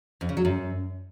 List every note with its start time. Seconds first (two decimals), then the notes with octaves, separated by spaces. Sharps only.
0.21 F2
0.29 C#3
0.37 F#3
0.45 F#2